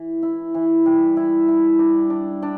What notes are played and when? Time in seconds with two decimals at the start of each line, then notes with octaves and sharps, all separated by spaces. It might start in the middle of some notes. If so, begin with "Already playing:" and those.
Already playing: E3
0.23 E4
0.54 E3
0.86 G3
1.17 E4
1.48 E4
1.79 D4
2.10 D4
2.42 D4